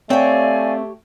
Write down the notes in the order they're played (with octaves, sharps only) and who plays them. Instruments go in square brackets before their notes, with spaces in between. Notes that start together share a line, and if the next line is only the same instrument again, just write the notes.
[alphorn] A3 [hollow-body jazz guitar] C4 [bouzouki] G4 C#5 [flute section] D5 F5 G#5